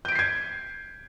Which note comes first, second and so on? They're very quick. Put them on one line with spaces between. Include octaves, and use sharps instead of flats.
G6 D7 B6 C7 G#6